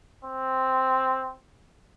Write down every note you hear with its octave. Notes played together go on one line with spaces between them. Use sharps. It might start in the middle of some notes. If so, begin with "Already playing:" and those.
C4